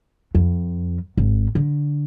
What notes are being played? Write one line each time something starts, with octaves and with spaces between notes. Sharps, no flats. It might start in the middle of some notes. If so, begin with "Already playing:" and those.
F2
G#1
D3